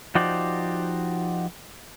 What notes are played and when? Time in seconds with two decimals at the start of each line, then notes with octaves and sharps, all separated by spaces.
0.15 F3 D#4 F#4 G4 C5 D5